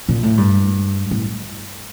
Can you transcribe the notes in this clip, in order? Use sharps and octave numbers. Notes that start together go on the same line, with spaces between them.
A#2
A2
G2
A2